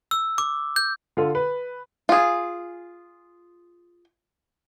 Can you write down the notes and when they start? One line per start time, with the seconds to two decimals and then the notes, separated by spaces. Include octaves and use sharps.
0.11 E6
0.38 D6
0.76 G6
1.17 D3 F4 A4
1.35 B4
2.09 F4 G#4